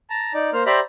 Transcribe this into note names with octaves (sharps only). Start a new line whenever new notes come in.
A5 A#5
D#4 D5
A#3 C5 F6
G4 C5 D5 E5 A#5 B5